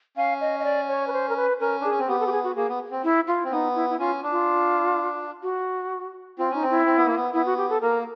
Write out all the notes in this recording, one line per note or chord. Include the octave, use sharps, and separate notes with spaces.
C#4 F5
D#5
D#5
D5
C#5
B4
C5
A#4
B4
C#4 A#4
D4 G#4
C#4
C4
B3 G4
A4
G4
G#4
F#4
A#3 G#4
B3
C4
E4
F4
C4
B3 D#4
E4
E4
C#4 F4
D4
F4
F#4
C4 F4
C#4 D#4
C4
E4
C4
B3
A#3
B3
B3 E4
F#4
G4
A4
A#3 A#4